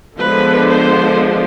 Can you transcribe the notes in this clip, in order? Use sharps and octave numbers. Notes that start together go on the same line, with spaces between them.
D3 F3 G#3 B3 D4 B4
C5